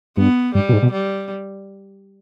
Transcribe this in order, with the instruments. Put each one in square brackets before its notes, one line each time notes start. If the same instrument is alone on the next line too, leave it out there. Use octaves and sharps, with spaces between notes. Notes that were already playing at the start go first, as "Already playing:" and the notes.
[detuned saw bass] G2 [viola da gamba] B3
[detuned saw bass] G2 [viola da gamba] G3
[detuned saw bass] B2
G#2
B2
[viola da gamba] G3